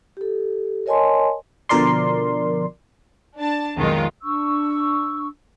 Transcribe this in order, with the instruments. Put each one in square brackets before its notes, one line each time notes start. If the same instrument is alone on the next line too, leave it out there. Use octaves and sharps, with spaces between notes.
[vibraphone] G4 A4
A#4 C#5 D#5 G#5 A5 C6
[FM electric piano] B2 D3 F3 A#4 D5 C6
[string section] D4 A5
B1 F2 D#3 F#3 G#3 F4
[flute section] D4 C#6 E6